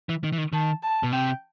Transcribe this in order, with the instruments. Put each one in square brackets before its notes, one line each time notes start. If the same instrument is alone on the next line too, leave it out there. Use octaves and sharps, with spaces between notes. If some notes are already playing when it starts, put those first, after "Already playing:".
[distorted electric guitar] E3
D#3
E3
D#3
[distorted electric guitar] D#3 [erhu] A5
[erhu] A5
[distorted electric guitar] B2
[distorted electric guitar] C3 [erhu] G5